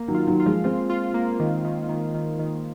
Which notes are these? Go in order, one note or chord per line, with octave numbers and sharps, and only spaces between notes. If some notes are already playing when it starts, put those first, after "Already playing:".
Already playing: A#3
D#3 F#3
F4
D#3 F#3
F4
F3 G#3
G#3 C4 F4
F4
A#3
D#3
D#3
D#3
D#3
D#3